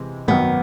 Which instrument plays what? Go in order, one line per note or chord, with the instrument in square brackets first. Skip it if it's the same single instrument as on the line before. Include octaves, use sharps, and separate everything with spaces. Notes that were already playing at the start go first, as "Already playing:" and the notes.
Already playing: [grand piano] C3 E3 G#3
[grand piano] G#1 F#2 D#3 [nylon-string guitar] B3